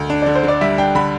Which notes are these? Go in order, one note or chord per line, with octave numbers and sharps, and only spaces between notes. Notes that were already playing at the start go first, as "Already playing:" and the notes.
Already playing: D2
D4
D3 D5
C5
D3 D5
G3 E5
D4 G5
D3 B5